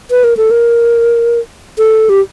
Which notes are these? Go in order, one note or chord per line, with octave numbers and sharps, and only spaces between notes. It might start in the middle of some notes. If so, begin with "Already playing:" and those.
B4
A#4
A4
A#4
A4
G4